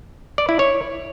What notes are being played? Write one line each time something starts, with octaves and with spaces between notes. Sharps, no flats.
D5
E4
C#5